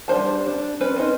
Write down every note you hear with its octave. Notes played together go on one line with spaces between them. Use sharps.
G3 D4 C5 A5
D4
C#4 B4 C5 D5
C4 C#4 D#4